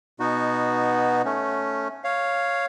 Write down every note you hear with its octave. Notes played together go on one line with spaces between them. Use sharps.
B2 B3 D#4 F#4
A3 C#4
C#5 F5